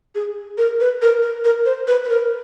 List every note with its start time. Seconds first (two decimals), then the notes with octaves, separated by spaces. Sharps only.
0.15 G#4
0.58 A#4
0.80 B4
1.02 A#4
1.22 A#4
1.45 A#4
1.66 C5
1.88 B4
2.05 B4
2.10 A#4